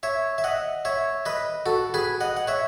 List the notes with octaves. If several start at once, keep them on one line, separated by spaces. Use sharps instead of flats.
C#5 E5
E5
D#5 F#5
C#5 E5
B4 D#5
F#4 A4
G#4 B4
D#5 F#5
F#5
C#5 E5